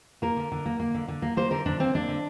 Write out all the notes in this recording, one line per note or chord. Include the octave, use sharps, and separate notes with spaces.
A#3 A#4
D3
D3
A#3
A#3
D3
D3
A#3
A#3 C5
D3 A#4
D3 D4
A#3 C4
A#3 D4
D3